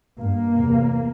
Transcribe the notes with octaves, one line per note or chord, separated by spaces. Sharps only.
G2 A#3
E2 C3